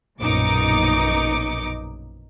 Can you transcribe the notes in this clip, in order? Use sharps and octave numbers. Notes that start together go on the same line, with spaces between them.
A#1 F#2 B2 D#4 D6 C#7